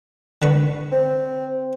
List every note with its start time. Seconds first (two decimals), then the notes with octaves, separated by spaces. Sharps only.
0.42 D3 B4 C#6
0.92 C4